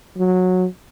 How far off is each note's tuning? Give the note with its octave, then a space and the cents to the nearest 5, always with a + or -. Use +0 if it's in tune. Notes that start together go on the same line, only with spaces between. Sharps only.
F#3 -15